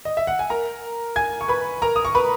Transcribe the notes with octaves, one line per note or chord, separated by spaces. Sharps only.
D#5
E5
F#5
G#5
A#4 A#5
G#5 G#6
C#6
B4 B5
A#4 A#5
D#6
C#6
B4 B5